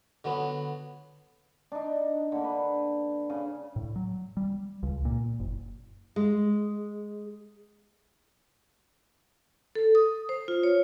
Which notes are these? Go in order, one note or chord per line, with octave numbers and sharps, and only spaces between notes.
D3 F#3 B3
D4 D#4
D3 A#3
B4
C#3
A2
F#3
G3
C#2
A#2
F#1
G#3
A4
D#6
C5
F4
C#5